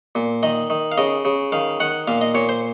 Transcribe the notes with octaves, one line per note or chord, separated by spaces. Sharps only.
A#2
D#3 D#5
D#3
F5
C#3 D#5
C#3
D#3 F5
D#3 F#5
A#2 F5
D#5
A#2 C#5
C5